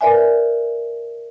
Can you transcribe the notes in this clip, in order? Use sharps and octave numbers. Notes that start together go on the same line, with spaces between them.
A#4 B4 D5 E5 G#5